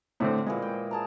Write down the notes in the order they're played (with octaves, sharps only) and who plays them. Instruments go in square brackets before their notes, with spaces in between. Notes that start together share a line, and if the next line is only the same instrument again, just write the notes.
[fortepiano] A2 D3 C4 [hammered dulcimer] C5 E5
[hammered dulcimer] A#2 E3 F#5 [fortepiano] G#3
[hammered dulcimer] G5
G#4 A5 A#5